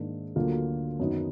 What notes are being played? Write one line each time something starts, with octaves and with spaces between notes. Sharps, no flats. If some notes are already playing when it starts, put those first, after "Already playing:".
Already playing: G#2 D#3 A#3 D4
D2 D3 F#3 A#3 F4
F#2 D#3 F#3 B3 D#4